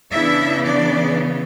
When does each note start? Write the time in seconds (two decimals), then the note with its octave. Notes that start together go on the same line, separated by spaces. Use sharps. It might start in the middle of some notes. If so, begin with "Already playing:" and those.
0.12 C#3 E3 B3 D4 E4 E5
0.64 D4 D5